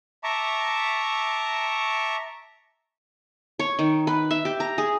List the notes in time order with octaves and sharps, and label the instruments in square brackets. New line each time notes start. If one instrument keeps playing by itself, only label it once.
[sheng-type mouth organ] E5 A5 A#5 C#6 D6
[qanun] C#5
D#3
B4
E5
G4
A#5
G#4